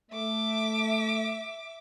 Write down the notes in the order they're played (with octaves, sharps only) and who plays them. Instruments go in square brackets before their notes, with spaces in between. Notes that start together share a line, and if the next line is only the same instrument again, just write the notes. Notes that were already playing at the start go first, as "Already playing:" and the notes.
[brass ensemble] A3 [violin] E5 D6